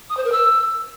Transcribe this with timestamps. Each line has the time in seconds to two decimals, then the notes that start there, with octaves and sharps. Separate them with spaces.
0.09 D#6
0.17 C5
0.24 A#4
0.32 E6